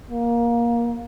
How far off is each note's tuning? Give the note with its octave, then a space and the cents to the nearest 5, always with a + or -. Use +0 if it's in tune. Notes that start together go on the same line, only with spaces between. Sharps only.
A#3 +15